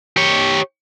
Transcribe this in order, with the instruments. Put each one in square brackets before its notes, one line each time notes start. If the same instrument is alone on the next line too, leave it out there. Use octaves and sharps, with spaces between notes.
[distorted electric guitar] G4 C#5